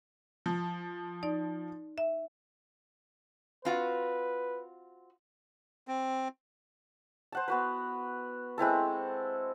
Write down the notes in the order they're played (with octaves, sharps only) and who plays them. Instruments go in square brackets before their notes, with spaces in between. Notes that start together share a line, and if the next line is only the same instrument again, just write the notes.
[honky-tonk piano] F3
[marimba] D#4 D5
E5
[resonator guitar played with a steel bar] C4 F4 F#4 [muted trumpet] B4
[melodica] C4
[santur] C5 F#5 A5
B3 F#4 B4
G#3 C4 E4 A4